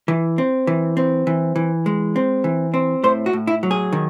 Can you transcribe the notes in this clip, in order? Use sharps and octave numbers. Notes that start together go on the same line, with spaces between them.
E3
C4
E3
C4
E3
E3
G#3
C4
E3
C4
A2 C5
F#4
A2
E4
F#3
G#4
D#3